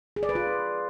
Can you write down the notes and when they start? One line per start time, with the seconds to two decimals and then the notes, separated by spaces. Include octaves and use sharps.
0.16 G#4
0.23 D5
0.29 B4
0.35 F4